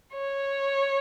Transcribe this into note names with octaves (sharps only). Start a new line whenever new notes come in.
C#5